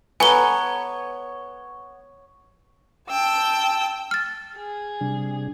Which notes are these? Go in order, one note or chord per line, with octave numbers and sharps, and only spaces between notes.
B3 A4 B4 C#5 G#5 A#5 G7
G5 A5 E6
F6 A6
G#4
C3 G3 D4